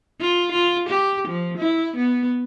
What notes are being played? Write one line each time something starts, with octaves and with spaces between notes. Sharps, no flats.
F4
F4
G4
F3
E4
B3